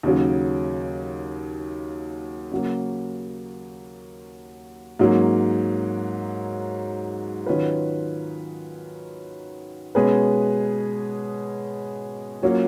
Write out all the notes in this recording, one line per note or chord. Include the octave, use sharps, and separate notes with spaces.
D#2 C#3 F#3
C#3 F#3 A#3
G#2 F#3 A#3 C#4
D#3 F#3 C#4 F4 B4
B2 G#3 C#4 G#4 B4
F#3 A#3 C#4 F4